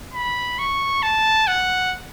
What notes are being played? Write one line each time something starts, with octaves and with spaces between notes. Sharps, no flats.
B5
C#6
A5
F#5